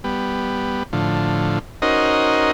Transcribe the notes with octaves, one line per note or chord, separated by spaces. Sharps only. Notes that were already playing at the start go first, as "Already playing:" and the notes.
G3 B3
A2 D3 F3
C#4 D#4 F#4 A#4 C5 D#5